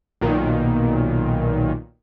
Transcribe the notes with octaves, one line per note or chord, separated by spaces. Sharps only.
B1 A#2 D#3